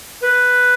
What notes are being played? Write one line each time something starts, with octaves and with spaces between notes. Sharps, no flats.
B4